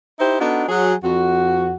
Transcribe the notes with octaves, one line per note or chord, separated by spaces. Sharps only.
D#4 E4 G4 C5
B3 D4 D#4 F#4 A4
F#3 G#4
F2 F#4